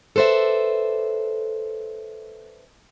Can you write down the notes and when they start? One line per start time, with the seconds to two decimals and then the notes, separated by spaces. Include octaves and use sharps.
0.16 A4 B4 C5 D5 E5